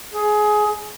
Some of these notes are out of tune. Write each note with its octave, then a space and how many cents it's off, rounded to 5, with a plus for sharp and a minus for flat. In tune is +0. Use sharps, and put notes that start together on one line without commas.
G#4 +20